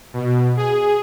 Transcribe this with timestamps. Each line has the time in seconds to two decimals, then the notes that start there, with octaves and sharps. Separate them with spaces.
0.13 B2
0.57 G#4